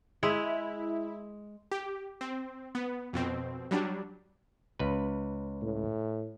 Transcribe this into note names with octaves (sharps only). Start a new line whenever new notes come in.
G#3 E4
G4
C4
B3
F2 B2 C4
F#3 G3 D4
C#2 B4
A2